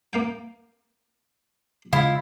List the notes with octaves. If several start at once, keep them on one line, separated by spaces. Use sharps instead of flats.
A#3 F5 G5
C#3 G#3 E4 F4 F5